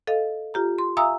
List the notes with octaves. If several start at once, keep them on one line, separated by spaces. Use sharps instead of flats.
A4 D#5 F5
F4 G4 A#5
C6
E5 F5 G#5 A#5 D#6 E6